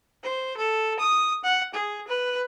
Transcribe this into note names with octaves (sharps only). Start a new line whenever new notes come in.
C5
A4
D#6
F#5
G#4
B4